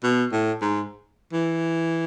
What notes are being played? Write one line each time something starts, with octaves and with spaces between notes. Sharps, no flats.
B2
A2
G#2
E3